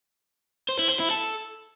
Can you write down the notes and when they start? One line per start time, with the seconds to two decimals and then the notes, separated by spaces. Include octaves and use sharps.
0.69 C5
0.79 E4
0.89 C5
1.00 E4
1.10 A4